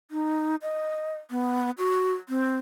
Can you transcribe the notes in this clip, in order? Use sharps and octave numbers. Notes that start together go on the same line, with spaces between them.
D#4
D#5
B3
F#4
C4